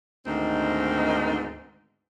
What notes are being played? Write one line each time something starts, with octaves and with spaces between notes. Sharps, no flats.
D2 G#2 D#3 B3 C4 D#4